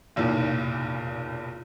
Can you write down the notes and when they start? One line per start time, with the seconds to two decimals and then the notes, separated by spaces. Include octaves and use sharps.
0.16 F1 B1 E2 A#2